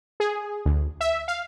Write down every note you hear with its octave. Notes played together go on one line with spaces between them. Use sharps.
G#4
D2
E5
F5